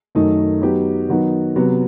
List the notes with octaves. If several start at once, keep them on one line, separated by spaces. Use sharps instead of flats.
F#2 D#3 A3 D#4
F#3 B3 D#4 G4
D#3 F#3 B3 D#4
C3 F#3 B3